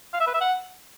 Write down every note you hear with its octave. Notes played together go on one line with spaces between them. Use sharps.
F5
E5
B4
E5
F#5